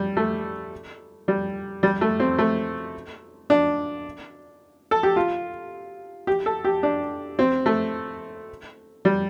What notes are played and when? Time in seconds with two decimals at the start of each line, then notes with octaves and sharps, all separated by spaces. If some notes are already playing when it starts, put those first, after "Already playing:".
Already playing: G3
0.17 A3
1.28 G3
1.83 G3
2.01 A3
2.20 C4
2.38 A3
3.50 D4
4.91 A4
5.03 G4
5.16 F4
6.27 G4
6.46 A4
6.65 G4
6.83 D4
7.39 C4
7.66 A3
9.05 G3